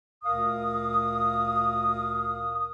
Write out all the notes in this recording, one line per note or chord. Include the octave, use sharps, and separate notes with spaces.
D2 A#2 A#4 F5 D#6